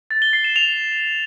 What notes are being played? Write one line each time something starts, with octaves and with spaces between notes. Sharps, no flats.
A6
G7
C7
E7
F7